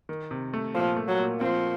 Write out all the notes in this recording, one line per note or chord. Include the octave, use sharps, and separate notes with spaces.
D#3
C3
A3
A#2 F3
A3
F#3
A#2
F3 C4